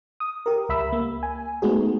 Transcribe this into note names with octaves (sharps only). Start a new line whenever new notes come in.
D#6
G4 A#4
C#2 E5 B5 E6
A#3
G#5
G#3 A3 B3 D#4 F#4 G#4